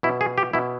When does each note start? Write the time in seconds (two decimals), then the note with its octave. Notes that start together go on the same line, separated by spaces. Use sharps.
0.03 B2 E4
0.21 G#4
0.38 G4
0.53 B2 E4